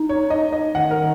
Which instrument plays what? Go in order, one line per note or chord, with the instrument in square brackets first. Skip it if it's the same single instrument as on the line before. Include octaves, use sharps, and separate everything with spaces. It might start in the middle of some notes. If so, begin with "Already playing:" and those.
Already playing: [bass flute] D#4
[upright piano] C#5
D#5
D#5
[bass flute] D#3 [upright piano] F#5
[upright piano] A#4